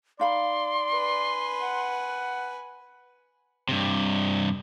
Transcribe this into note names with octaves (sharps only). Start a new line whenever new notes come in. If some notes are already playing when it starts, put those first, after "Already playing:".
D#4 D5 F5 B5 C6
B4 G#5
F#5
G2 C3